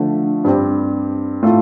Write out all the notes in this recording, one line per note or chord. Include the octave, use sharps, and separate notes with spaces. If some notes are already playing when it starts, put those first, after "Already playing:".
Already playing: D3 F3 A3
G2 G3 C4 G4
A2 A3 F4 A4